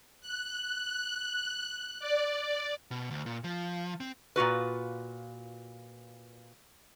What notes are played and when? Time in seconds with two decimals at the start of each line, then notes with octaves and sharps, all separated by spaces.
0.21 F#6
2.00 D5
2.91 B2
3.11 D2
3.26 A#2
3.44 F3
4.00 C4
4.36 A#2 F4 F#4 B4